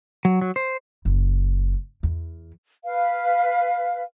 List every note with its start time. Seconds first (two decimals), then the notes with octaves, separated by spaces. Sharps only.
0.25 F#3
0.41 F#3
0.56 C5
1.05 F#1
2.03 E2
2.84 B4 F5